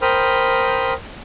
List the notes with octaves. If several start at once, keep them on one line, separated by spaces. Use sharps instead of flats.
A#4 C5 G5 B5 D#6 F6